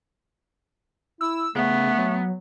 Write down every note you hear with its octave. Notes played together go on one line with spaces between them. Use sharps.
E4 E6
C#3 A3 B3
F#3